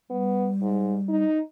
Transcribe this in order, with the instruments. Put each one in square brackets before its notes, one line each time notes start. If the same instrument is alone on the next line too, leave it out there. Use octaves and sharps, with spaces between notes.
[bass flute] G3 [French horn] B3
[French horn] G#2
D#4